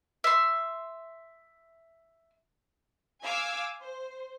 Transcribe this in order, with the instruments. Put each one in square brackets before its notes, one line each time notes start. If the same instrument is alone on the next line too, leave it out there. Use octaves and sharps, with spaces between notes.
[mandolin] E5 C6
[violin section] F5 G#5 D6 E6 G#6
C5